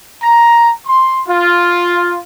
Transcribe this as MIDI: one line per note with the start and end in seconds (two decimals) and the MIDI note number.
0.20 0.71 82
0.86 1.20 84
1.26 2.19 65